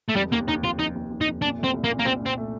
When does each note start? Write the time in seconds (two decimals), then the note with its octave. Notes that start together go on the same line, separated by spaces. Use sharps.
0.09 A3
0.16 F1 G3
0.32 D#2 A#3
0.47 D#2 D#4
0.64 F1 F4
0.79 F1 D#4
0.95 D#2
1.11 D#2
1.21 D#4
1.26 F1
1.42 A#2 D4
1.59 A3
1.64 C4
1.74 C2
1.84 A#3
1.89 A#2
2.00 A#3
2.06 C2 C4
2.21 A#2 C4
2.38 A3